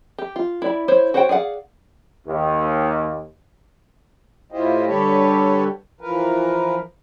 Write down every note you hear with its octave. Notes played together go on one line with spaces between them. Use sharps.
G4
F4
E4 D5 B5
E4 C5 C#5
F#4 C5 C#5 F#5 G5
G#4 D5 F5 F#5
D#2
A2 E4 F4 G4 C5 D#5
D3 G3 G4 A4 B4 C#5
E3 F3 A#4 B4